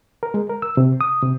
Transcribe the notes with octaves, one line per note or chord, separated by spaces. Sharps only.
A#4
G#3
A#4
E6
C3
D#6
C3